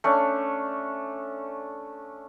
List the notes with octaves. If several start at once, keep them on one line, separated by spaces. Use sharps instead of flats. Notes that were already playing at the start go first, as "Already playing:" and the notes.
A3 C#4 D4